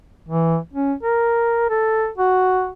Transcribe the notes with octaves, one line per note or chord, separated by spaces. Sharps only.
E3
C#4
A#4
A4
F#4